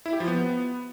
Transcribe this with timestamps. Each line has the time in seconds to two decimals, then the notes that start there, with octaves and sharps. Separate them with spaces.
0.06 E4
0.13 G4
0.20 F3
0.27 B3